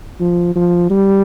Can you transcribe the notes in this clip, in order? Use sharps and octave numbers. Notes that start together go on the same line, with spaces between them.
F3
F3
G3